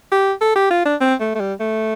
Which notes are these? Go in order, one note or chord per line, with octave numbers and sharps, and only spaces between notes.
G4
A4
G4
F4
D4
C4
A3
A3
G3
A3